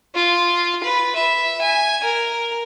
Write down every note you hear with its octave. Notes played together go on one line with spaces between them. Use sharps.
F4
B4
E5
G#5
A#4